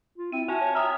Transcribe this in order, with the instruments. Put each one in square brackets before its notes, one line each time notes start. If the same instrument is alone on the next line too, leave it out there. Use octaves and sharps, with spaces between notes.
[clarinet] F4
[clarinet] C4 [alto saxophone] E4 [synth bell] D#7
[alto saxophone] F#4 [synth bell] E5 A5 [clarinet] G#5
[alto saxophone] C#5
[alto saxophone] E5 [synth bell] G5 D#6 F6 [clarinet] A#5